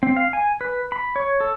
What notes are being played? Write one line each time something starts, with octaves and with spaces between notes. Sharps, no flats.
C4
F5
G#5
B4
B5
C#5
A4